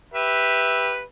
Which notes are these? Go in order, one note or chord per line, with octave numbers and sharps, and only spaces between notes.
G4 B4 E5